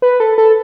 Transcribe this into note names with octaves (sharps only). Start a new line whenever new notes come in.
B4
A4
A4